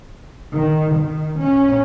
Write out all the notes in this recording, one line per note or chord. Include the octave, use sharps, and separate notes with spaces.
D#3
D#3
C#4